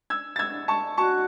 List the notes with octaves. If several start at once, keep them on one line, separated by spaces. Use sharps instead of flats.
E6 G#6
A6
E6 G#6
A5 C#6
F#4 A5 C#6